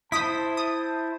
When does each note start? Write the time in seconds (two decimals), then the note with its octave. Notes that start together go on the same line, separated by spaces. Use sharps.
0.12 E4 C5 A5 D#6 B6
0.57 D#6